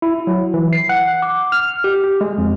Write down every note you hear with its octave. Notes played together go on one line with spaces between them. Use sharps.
E4
F#3
E3
C7
F#5
D6
F6
G4
G4
G#3
F2